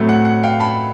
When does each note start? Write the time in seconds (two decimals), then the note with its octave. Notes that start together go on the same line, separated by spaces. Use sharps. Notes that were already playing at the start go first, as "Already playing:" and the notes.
Already playing: A2 F#3 A3 C4
0.09 F#5
0.25 F#5
0.43 F5 G5
0.60 A5 B5